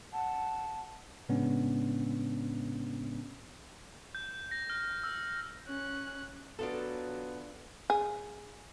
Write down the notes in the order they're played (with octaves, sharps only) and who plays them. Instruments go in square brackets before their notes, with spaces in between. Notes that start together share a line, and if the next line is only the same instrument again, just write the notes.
[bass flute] F#5 [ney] A5
[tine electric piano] A2 C#3 G#3 B3 C#4 D4
[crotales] G6
A#6
F6
E6
[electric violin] C#4 F#6
[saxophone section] F#3 B3 [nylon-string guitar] D4 F4 A4
[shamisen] G#4